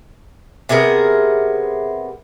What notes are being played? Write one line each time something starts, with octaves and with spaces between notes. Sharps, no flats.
C3 B3 G#4 A#4